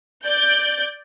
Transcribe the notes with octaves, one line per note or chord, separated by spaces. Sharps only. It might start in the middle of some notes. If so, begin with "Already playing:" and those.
D5 G6